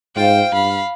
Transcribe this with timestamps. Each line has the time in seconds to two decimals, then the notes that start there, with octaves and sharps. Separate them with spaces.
0.16 G#2 F4 C5 G5
0.52 G2 F5 B5